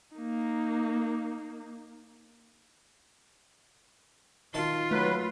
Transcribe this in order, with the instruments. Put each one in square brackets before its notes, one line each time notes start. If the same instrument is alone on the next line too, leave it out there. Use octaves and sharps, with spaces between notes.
[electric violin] A#3 D#4
[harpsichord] D#3 A5 C6 [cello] F4
[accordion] F#3 B4 [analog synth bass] A3